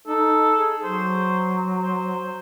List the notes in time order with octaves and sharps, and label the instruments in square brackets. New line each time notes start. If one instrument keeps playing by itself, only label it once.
[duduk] D#4 [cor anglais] A4
[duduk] G#4
[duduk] F#3 [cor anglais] C5
[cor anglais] C5